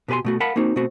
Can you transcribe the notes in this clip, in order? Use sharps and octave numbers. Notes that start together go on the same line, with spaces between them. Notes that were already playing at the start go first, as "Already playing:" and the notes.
B2 G4 B4 G#5 C6
B2 A3 F#4
A#4 F5 F#5 A5 B5
A#3 C4 D#4 F#4
B2 A3 C4 F#4